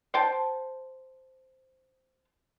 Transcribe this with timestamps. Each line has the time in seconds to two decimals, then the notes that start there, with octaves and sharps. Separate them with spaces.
0.14 C5 G5 A5